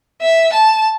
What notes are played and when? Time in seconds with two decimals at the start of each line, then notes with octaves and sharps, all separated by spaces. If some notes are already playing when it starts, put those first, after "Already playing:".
0.21 E5
0.53 A5